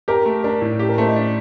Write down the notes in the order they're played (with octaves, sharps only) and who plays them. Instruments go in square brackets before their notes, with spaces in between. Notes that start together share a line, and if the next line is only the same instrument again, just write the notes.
[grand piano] G4 [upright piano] A#4
[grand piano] A3
[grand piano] D4 [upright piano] A#4
[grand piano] A2
G4
[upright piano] A#4
[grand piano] A3 [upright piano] C5
[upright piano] D#5
[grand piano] D4